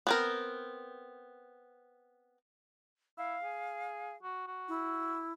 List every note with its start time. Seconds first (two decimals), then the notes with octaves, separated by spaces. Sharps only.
0.07 B3 C4 A#4
3.18 E4 F5
3.43 G#4
4.22 F#4
4.47 F#4
4.68 E4